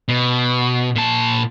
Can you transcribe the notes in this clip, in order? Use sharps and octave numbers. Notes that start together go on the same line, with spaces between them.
B2
A#2 A5